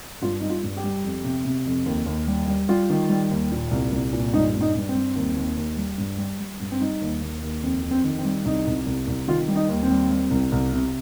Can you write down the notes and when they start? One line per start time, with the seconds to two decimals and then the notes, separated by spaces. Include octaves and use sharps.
0.22 G2 F4
0.40 G3 D#4
0.50 F4
0.63 G2
0.77 G4
0.84 G3
1.04 F2
1.24 C3
1.45 C3
1.66 F2
1.86 D#2
2.06 D#2
2.27 G3
2.48 G3
2.69 G3 F4
2.90 D#3
3.09 G3
3.31 D#2
3.52 A#2
3.71 C2
3.92 C2
4.13 A#2
4.33 G2 D#4
4.54 G2
4.61 D#4
4.75 G2
4.89 C4
4.95 G3
5.16 D#2
5.37 D#2
5.57 D#2
5.77 G3
5.98 G2
6.18 G3
6.40 G3
6.60 G2
6.72 C4
6.80 G3 D#4
7.01 D#2
7.22 D#2
7.43 D#2
7.63 F2 C4
7.83 F2
7.91 C4
8.04 D#3
8.19 C4
8.25 G3
8.45 C2 D#4
8.67 C2
8.86 C2
9.07 C2
9.28 D#3 F4
9.48 G3
9.55 D#4
9.69 D#2
9.83 C4
9.90 G3
10.11 G3
10.30 C2
10.52 C2
10.73 C3